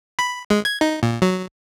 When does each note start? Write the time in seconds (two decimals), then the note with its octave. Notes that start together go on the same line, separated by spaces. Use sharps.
0.19 B5
0.50 G#3
0.65 G#6
0.81 D#4
1.03 A#2
1.22 F#3